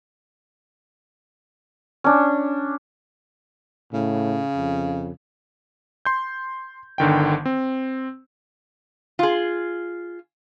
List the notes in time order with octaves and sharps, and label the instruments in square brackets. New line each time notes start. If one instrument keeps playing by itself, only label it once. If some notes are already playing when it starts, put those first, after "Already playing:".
[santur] C#4 D4
[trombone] A2 [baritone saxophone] C#3
[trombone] F2
[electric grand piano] C6 G6
G1 D3 D#3 G5
C4
[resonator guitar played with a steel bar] F4 G#4